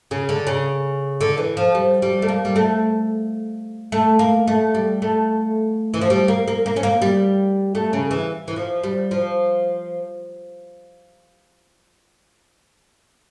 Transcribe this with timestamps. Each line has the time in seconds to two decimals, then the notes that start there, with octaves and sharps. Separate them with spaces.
0.11 C#3
0.29 D3
0.47 C#3
1.21 D3
1.38 E3
1.57 F3
1.75 G3
2.02 G3
2.22 A3
2.28 A#3
2.45 G3
2.56 A3
3.92 A3
4.19 A#3
4.48 A3
4.75 G3
5.02 A3
5.94 E3
6.01 F3
6.10 G3
6.28 A#3
6.48 A#3
6.66 A#3
6.76 C#4
6.83 A#3
7.02 G3
7.75 A3
7.93 C#3
8.11 E3
8.48 E3
8.56 F3
8.83 G3
9.11 F3